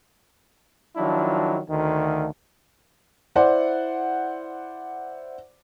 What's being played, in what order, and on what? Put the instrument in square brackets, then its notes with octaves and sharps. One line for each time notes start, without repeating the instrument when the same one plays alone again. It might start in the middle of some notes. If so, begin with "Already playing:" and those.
[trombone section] D#3 F3 F#3 D4 E4
D2 D#3
[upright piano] E4 C5 D5 F#5